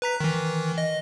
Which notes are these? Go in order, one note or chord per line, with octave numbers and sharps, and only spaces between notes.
B4 A#5 B6
D#3 E3
D#5